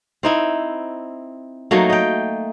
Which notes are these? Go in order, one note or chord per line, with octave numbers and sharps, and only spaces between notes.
C4 D#4 E4
F#3 A3 A#3 D#4
D#5 G5